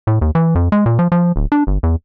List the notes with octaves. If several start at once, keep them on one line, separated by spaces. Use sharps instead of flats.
A2
D#2
E3
F2
G#3
A#2
F3
F3
D1
D4
G1
E2